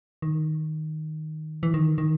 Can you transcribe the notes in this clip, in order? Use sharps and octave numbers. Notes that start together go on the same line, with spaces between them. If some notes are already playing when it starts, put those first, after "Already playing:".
D#3
E3
D#3
D#3